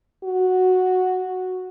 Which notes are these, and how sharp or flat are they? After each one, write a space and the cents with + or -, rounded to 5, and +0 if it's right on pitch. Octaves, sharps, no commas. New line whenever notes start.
F#4 -5